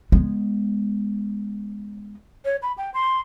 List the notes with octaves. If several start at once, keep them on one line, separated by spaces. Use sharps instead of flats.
G#3 B3
C#5
B5
G5
C6